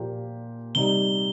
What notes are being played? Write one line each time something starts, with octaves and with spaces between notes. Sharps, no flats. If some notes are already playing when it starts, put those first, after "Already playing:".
Already playing: A#2 F3 A#3 G4
C3 G3 D#4 G4 G7